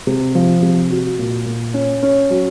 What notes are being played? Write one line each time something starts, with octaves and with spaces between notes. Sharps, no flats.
C3
F3
C3
F#4
A#2
A#2
C#4
C#4
F#3